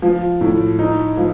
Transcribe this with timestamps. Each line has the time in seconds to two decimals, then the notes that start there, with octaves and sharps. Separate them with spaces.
0.02 F3
0.41 A2
0.79 D#4
1.17 F3